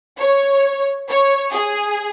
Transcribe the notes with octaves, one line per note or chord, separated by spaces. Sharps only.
C#5
C#5
G#4